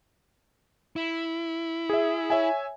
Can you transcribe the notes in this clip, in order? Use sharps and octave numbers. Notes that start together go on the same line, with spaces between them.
E4
G#4 E5
C#5 E5 G#5